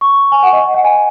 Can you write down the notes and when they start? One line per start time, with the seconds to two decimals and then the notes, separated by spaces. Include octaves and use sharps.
0.01 C#6
0.32 G#5
0.43 F#5
0.53 D#5
0.64 D#5
0.74 F#5
0.84 G#5